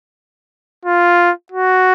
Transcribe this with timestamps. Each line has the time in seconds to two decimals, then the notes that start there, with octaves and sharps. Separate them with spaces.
0.85 F4
1.52 F#4